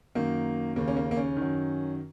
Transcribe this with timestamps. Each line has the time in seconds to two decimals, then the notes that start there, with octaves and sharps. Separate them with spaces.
0.15 F#2 D#3 A#3
0.76 D#2 C#3 A#3
0.88 C#4
0.96 A#3
1.11 A#3
1.17 C#4
1.37 D#3
1.42 F#2